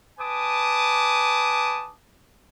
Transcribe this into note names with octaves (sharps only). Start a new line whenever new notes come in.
B4 G#5 A5 D6 D#6